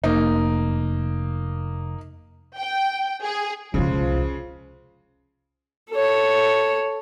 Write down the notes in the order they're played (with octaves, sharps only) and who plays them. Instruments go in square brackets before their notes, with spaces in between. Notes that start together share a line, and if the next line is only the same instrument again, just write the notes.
[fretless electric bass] F1 [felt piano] A#3 D#4
[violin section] G5
G#4
[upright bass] E1 C2 [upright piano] C#3 G#3 [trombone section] F3
[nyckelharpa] A4 C#5